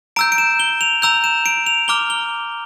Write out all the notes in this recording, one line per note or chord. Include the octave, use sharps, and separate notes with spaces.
A#5 E6 G6 D7
D7
E7
G7
F7
A#5 E6 G6 F7
E7
D7
F7
A#5 D6 F6 G7
G7